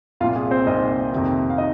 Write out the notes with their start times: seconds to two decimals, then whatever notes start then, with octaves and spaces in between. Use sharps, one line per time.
0.20 C2 F4 F5
0.24 A#2
0.35 G#4 G#5
0.51 C4 C5
0.66 C2 A#2 D#4 D#5
1.12 F2 C3 D#3
1.50 F5
1.58 D#4 D#5